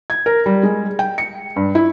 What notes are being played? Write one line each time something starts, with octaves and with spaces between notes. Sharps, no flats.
G#6
A#4
G3
G#3
G5
C#7
G2
E4